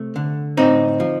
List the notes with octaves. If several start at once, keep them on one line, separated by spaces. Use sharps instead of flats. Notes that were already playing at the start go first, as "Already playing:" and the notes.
Already playing: C3 A3
D3
A2 C4 D#4
F3